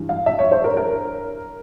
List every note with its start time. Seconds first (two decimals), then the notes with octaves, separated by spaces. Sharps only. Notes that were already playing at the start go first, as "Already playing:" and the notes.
Already playing: G2 E3 G3
0.09 F5
0.26 E5
0.39 C#5
0.51 C5
0.64 A#4
0.77 A#4